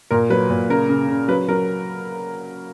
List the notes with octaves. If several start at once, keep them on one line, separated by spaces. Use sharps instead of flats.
A#2 A#4
F#3 B4
A#2
C#3 A#4
C#3
C#3
F#3 B4
F#3 A#4